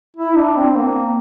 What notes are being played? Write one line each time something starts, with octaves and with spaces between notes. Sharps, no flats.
E4
D4
C4
A#3